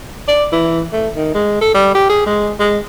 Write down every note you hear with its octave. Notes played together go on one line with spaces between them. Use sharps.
D5
E3
A3
D#3
G#3
A4
G3
G4
G#4
G#3
G#3